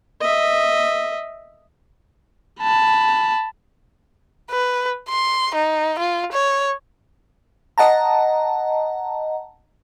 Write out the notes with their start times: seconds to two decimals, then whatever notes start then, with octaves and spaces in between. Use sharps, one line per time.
0.21 D#5 E5
2.61 A5 B5
4.51 B4
5.09 C6
5.55 D#4
5.99 F4
6.33 C#5
7.78 D#5 F#5 A5 A#5